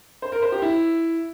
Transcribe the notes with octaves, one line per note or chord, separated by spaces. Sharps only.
C5
A#4
C5
G4
E4